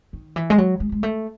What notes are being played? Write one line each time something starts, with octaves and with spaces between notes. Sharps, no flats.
D#3
E3
G#3
F#3
G#3
G#3
A3